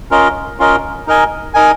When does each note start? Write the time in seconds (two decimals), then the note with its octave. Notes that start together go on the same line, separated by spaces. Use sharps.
0.11 C#4 F4 A#4 D#5
0.59 C#4 F4 A#4 D#5
1.07 D#4 A#4 D#5 G#5
1.54 D#4 A#4 D#5 G#5